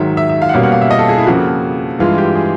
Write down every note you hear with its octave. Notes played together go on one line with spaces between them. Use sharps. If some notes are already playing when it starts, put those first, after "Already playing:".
Already playing: G#2 D#3 F#3 E5
E5
E5
F5
F#5
B2 G3 A#3 C#4 F5
F#5
F5
E5
D#5
A4
G#4
E4
F2 C#3 F3 A#3 F#4
G2 E3 G#3 F4
G4
G#4